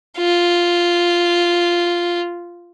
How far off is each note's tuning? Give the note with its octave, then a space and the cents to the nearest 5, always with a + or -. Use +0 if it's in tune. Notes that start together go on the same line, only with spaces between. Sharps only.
F4 -5